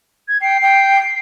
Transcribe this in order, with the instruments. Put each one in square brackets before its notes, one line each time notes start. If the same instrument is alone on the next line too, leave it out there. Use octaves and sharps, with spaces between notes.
[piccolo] G#6
[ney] G5 [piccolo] C7
[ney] G5